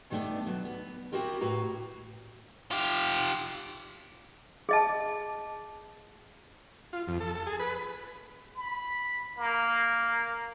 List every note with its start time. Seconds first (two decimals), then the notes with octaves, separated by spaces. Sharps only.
0.10 G2 D#3 G3 A3 B3 D4
0.47 B2 F#3
0.65 B3
1.12 C4 E4 F#4 G4 A#4
1.41 A2 F#4 B4 A#5
2.71 F4 G4
4.69 G#4 D#5 A5
6.93 F4
7.07 F2
7.20 A4
7.35 A4
7.47 G#4
7.59 B4
8.56 B5
9.37 A#3